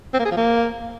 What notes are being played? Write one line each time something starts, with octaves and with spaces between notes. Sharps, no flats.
C4
A#3
G#4
F3
A#3